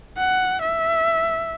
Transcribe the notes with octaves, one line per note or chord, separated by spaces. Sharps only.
F#5
E5